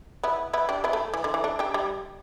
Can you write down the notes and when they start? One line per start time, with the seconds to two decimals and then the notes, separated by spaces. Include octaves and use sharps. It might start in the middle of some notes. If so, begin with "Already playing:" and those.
0.24 B3 E4
0.53 B3 E4
0.69 D4 G4
0.84 B3 E4
0.93 A3
1.14 E3
1.24 D3
1.34 E3
1.44 A3 D4
1.59 D4 G4
1.74 G3